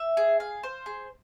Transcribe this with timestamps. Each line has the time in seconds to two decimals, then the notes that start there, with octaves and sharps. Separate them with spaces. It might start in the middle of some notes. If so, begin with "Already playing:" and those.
Already playing: E5
0.17 G#4
0.40 F5
0.63 C5
0.86 G#4